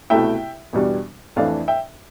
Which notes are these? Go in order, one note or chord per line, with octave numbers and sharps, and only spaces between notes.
C2 B2 A3 E4 E5 G5
E2 B2 G3 D4
F2 E3 A3 D4 D5 F5
E5 G5